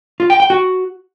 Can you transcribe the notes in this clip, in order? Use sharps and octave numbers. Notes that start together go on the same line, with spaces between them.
F4
G5
G5
F#4